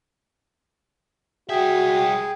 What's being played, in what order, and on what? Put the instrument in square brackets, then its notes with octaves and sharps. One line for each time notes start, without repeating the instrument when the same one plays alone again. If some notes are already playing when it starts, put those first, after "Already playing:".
[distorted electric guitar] G3 E5 [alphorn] F#4 [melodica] G#4 [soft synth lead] G5